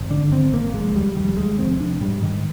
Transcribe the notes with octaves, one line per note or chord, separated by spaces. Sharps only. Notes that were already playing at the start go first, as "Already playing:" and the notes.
Already playing: G#1
D3 D4
G#1 C4
G#1 A#3
F1 G#3
D#2 G3
F1 G3
D#2 G#3
F1 C4
F1 D4
G#2 G3
G#2 D#3